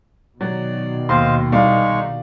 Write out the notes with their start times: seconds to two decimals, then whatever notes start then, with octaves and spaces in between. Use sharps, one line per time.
0.41 B2 D#3 F#3 D5
1.09 D#2 C5 D#5 F5 C6
1.52 C2 G#3 D#4 D5 F5 C#6